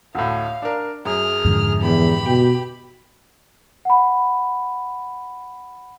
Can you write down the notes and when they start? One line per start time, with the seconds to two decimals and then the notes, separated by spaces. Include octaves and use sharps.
0.15 D2 A2 F5
0.62 D4 A#4
1.05 F#2 G#4 F6
1.45 F2 G#2 D3
1.82 E2 G4 B5
2.26 B2 G5
3.85 F#5 B5